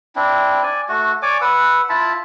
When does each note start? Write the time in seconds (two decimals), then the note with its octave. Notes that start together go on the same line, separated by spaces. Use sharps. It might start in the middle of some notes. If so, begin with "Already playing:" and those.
0.16 C4 D4 E4
0.63 D5 G#5
0.89 A3 F#4
1.22 C#5 D5 G#5 D6
1.41 B4 F#5 E6
1.89 E4 F4 A5 B5